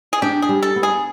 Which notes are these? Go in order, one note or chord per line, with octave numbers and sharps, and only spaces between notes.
G#4
D4 G4
G#4
G3
A4
B3
G#4